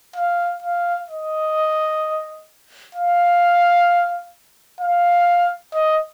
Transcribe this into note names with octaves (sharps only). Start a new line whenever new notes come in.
F5
F5
D#5
F5
F5
D#5